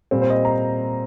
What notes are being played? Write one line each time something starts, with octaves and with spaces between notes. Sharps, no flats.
A#2 G3 C4
C5
D#5
A#5